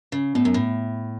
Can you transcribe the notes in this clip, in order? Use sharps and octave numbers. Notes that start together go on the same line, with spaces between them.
C#3
A2 B3
F#2
A2